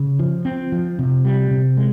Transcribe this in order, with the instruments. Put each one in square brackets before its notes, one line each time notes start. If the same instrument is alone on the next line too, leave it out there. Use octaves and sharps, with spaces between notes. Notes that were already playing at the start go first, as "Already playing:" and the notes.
Already playing: [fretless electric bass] C#3
F3
C4
F3
C3
G3
C3
G#3